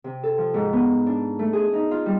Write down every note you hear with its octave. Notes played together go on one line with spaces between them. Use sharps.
C3
A4
F3
G#2
B3
D4
A3
G#4
D#4
F4
G3